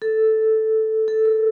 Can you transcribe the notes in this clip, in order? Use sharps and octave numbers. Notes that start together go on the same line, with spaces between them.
A4
A4
A#4